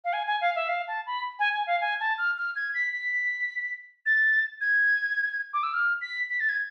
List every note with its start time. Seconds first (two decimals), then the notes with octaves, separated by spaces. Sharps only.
0.04 F5
0.13 G#5
0.27 G#5
0.41 F5
0.56 E5
0.69 F5
0.88 A5
1.07 B5
1.39 G#5
1.53 G#5
1.67 F5
1.81 G#5
2.00 A5
2.18 F6
2.38 F6
2.56 G#6
2.74 B6
2.93 B6
4.06 A6
4.61 G#6
5.54 D6
5.63 E6
5.74 F6
6.01 B6
6.30 B6
6.40 A6
6.49 G#6